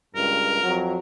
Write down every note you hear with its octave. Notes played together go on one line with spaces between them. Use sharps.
C#2 G2 A#4
F2 F#3